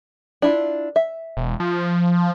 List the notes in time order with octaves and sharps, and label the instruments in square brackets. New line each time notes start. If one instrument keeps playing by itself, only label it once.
[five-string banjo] D4 E4 F4
E5
[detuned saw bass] E1
F3